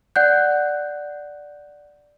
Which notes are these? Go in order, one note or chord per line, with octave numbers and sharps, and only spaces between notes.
D5 F#5 F#6 G6